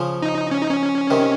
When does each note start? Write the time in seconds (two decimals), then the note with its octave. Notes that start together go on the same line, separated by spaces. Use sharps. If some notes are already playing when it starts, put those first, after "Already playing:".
Already playing: C#3 F3
0.22 D#4
0.51 C#4
0.61 D#4
0.70 C#4
1.11 C3 D#3